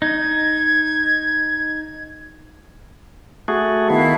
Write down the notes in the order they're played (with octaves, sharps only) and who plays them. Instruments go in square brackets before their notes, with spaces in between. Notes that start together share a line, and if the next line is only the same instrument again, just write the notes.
[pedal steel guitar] D#4 [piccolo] G#6
[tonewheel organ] A3 F#4 G#4
[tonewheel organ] D#3 B3 [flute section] E4 F5 A5